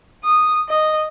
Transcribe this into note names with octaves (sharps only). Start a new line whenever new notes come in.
D#6
D#5